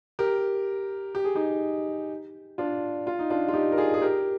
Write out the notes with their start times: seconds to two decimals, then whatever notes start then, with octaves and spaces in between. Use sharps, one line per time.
0.19 G4 A#4
1.15 G4
1.24 G#4
1.35 D#4 G4
2.58 D4 F4
3.07 F4
3.19 D#4
3.30 D4 F4
3.48 F4
3.54 D#4 G4
3.72 A#4
3.78 F4 G#4
3.94 G#4
4.02 G4 A#4